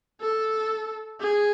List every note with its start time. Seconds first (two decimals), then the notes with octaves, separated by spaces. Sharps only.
0.21 A4
1.20 G#4